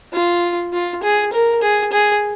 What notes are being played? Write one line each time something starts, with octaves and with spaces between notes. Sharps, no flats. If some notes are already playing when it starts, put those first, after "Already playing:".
F4
F4
G#4
A#4
G#4
G#4